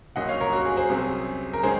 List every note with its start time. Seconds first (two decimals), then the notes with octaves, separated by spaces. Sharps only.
0.16 C2 A#2 F#3 C#4 D#5 F#5
0.29 C#5 F5
0.41 A#4 C#5
0.53 F#4
0.65 G#4
0.77 G#4 C5
0.90 C2 C3 F#3 C#4
1.53 A#4
1.63 D#3 G#3 C#4 G#4 C5